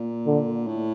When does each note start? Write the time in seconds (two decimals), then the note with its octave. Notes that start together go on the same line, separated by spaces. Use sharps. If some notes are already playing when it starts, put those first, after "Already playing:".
Already playing: A#2
0.26 D3
0.67 A2